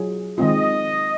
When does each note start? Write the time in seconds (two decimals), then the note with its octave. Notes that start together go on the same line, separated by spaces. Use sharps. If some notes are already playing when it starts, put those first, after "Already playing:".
Already playing: F#3 F4 G#4
0.38 D#3 G#3 C4 F4 D#5